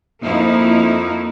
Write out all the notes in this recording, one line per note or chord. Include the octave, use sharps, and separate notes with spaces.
F2 F3 A#3 D#4 E4